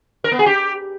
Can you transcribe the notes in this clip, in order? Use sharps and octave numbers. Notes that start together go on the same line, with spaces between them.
A#4
B3
G#4
G4